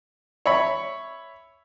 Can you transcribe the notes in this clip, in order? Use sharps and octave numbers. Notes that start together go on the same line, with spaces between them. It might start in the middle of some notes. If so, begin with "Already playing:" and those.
C#5 E5 B5